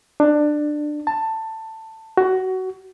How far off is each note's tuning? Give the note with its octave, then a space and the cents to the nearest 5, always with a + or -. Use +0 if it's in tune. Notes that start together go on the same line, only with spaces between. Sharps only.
D4 +20
A5 +15
F#4 +20